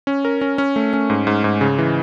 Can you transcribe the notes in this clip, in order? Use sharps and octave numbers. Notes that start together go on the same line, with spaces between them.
C#4
A#4
C#4
C#4
A3
C#4
G#2
G#2
G#2
C#3
E3